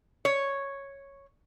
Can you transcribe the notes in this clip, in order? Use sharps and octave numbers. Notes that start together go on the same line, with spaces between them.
C#5